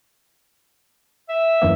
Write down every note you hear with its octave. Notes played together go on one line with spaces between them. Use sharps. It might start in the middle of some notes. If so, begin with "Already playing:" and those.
E5
F#2 E3 A#3